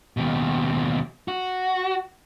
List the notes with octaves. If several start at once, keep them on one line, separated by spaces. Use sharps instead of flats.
D#2 B2
F#4